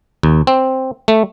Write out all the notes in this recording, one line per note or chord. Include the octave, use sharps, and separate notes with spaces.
D#2
C4
A3